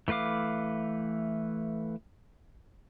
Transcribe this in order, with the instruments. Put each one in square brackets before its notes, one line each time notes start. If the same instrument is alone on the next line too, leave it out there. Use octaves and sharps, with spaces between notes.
[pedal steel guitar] E3 A3 B4 F5 D6